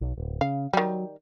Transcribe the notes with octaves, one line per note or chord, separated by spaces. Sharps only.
B1
D1
C#3 F5
D#3 F#3 G3